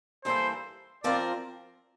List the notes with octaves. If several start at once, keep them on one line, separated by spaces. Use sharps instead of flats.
G2 E3 A#3 D4 A4 C5
F3 C4 F4 A#4 D5